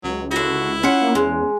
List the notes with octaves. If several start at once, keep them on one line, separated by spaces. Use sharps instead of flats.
C#2 F#3
D3 E4 F#4
C#4 F4 F#5
A#3
E2 G#3